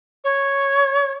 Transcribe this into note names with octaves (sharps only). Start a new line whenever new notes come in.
C#5